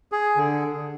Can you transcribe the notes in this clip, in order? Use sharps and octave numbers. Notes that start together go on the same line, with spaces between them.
G#4
D3